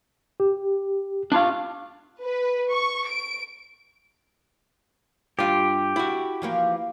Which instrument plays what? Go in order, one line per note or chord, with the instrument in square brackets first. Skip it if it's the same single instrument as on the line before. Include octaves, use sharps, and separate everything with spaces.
[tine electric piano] G4
[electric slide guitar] D4 F4 F5
[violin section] B4
C#6
D7
[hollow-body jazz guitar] G2 F4 [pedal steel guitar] G4
[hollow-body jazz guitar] E4 F#4
[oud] E3 F3 A#3